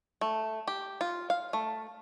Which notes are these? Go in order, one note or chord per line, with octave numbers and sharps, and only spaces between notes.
A3
G4
F4
F5
A3